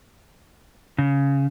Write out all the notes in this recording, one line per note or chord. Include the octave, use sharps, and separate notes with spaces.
C#3